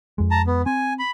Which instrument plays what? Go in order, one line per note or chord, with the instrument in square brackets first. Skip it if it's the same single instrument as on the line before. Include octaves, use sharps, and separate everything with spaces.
[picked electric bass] F2 G#3
[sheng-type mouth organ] A5 A#5
B3
[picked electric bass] C4 [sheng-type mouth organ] G#5
[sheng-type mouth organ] B5